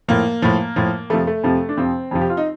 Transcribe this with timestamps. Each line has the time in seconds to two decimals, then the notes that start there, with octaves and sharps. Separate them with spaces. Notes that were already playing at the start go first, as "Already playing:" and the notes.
0.08 A2 F3 A#3
0.42 A2 F3
0.76 A2 F3
1.10 F2 C3 F3 A3
1.27 A3
1.44 F2 C3 F3
1.69 D4
1.77 F2 C3 F3 C4
2.11 F2 C3 F3
2.21 G4
2.30 F4
2.37 D#4